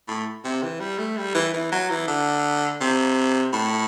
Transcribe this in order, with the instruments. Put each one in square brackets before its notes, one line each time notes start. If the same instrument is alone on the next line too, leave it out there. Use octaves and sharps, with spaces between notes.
[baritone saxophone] A2
C3
E3
G3
A3
G3
E3
E3
F#3
E3
D3
C3
A2